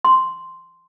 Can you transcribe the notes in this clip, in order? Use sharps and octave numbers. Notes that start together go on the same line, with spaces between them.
C6